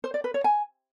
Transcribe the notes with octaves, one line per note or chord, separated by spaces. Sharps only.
C5
D5
B4
C#5
G#5